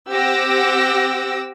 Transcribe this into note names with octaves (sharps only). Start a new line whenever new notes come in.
C4 G4 F#5 D6 E6 A#6